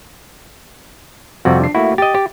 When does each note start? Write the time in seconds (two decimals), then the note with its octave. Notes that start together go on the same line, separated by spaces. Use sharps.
1.45 F2 C3 G3 F#4
1.60 D4 C7
1.75 A3 A#3 E4 F#4
1.98 G4 D#5 A6
2.15 G4